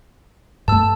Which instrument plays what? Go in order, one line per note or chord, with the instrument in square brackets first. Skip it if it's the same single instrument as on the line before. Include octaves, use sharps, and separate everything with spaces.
[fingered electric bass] G2 A3 [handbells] A5 E6